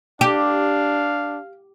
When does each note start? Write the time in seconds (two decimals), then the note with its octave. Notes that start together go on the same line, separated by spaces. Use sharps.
0.21 D4 G4 F5